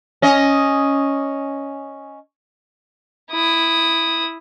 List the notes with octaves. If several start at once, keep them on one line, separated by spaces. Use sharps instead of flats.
C#4 D#5
E4 D#6